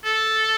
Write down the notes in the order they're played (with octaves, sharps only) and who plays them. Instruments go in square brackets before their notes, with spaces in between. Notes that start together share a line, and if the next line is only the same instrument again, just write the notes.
[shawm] A4